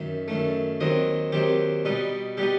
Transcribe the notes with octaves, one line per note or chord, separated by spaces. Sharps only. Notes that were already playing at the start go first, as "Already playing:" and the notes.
Already playing: F#2 D#3 E5
F#2 D#3 A3
D#2 D#3 F#3 C4 D#5
D#2 D#3 F#3 C4 G4
B2 G3 B3 D#4
B2 G3 B3 D#4 G4